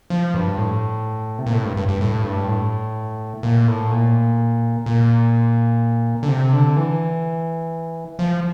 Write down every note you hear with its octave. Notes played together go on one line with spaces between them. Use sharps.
F3
G2
A2
C3
A#2
A2
G2
G2
G2
A2
G2
A2
A#2
A2
A#2
A#2
D3
C3
D3
E3
F3